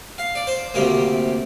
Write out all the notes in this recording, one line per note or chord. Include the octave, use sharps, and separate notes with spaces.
F5
D5
C5
D2 C3 G3 A#3 A#4